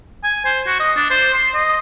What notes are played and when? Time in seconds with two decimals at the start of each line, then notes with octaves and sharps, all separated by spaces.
0.23 G#5
0.45 C5
0.67 F#4
0.80 D#5
0.96 D4
1.10 C5
1.34 C6
1.54 D#5